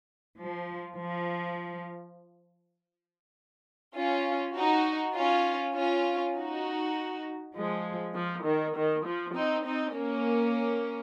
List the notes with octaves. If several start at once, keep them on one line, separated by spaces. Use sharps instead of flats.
F3
F3
C#4 F4
D#4 F#4
C#4 F4
C#4 F4
D#4 F#4
F3 G#3
F3
D#3
D#3
F3
C4 D#4
C4 D#4
A#3 C#4